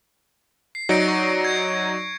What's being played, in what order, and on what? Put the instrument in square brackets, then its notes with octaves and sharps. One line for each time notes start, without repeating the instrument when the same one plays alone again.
[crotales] C7
[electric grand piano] F#3 D#4 D5 [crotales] A#6 C#7 D7
[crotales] C#6
G#6 C7